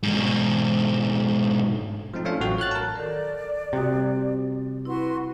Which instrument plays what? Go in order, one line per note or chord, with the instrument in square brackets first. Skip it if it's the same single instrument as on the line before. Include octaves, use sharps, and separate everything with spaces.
[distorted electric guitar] G#2 B2
[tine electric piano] F3 A3 C4 D#4
A3 C#4 D4 F4 C5 F5
A1 F#3 F#4 G5
C#5 F6 F#6 A6
A#4 A5
[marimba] D#3 A4 A#4 [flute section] D5
[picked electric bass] C3 [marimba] G3 F#4 D#6
[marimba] E4 [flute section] F#4 B4 C6